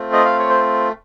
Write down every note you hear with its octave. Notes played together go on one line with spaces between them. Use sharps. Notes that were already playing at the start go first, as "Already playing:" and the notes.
Already playing: A3 C4 F4
D#5
F5
C#5
C5